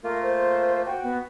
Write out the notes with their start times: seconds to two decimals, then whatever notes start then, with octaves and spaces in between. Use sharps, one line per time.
0.04 A3 A#3 F4 A#4
0.22 C5
0.86 F#4 G5
1.03 B3